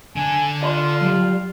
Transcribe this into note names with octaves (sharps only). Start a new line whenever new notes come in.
D3 D4 G#5
F4 D5 B5 C6
F#3 G3